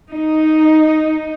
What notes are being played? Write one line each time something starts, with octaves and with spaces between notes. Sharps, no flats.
D#4